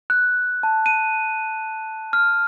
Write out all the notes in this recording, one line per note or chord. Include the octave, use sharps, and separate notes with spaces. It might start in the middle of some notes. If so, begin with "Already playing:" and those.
F#6
A5
D#7
F6